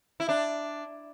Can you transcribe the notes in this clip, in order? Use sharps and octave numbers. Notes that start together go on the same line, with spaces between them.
E4
D4